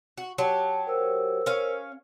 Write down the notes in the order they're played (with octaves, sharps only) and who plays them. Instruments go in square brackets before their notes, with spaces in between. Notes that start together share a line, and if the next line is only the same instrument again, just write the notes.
[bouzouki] F#4
[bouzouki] F#3 G4 [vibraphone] A5
[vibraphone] A#4 C5 E6
[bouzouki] C#4 F5